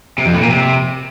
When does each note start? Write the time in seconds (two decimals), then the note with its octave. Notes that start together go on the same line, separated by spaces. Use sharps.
0.18 C3
0.26 F2
0.34 A2
0.42 A#2
0.50 C3